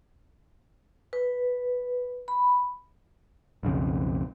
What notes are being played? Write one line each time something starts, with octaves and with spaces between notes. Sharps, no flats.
B4
B5
B1 F2 C#3